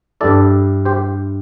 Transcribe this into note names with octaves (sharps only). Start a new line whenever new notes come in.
G2 G3 E4 A4 D5
G4 C5